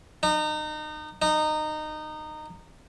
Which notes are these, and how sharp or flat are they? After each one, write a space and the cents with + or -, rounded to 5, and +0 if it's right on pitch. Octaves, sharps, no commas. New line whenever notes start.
D#4 -30
D#4 -20